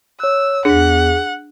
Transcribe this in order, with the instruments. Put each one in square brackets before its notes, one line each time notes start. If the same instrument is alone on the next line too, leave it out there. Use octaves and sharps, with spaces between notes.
[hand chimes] C#5 F#6 [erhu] E6
[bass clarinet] E2 [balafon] D4 [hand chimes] G#4 B6 [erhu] F#5